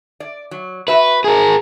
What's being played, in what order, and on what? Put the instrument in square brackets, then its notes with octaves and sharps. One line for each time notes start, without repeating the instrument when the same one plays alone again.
[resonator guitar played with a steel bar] D5
F#3
[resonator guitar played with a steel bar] F#4 E5 [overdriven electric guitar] B4
[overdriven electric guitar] G#4 A#4